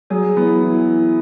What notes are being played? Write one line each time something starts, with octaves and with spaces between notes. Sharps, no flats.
F#3 G#4
E3 B3
E3
E3